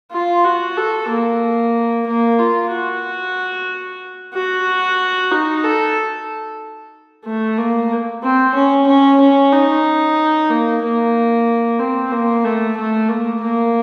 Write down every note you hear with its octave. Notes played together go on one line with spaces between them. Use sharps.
F4
F#4
A4
A#3
A#3
F4
F#4
F#4
D#4
A4
A3
A#3
C4
C#4
C#4
C#4
D#4
A#3
A#3
C4
A#3
A3
A3
A#3
A#3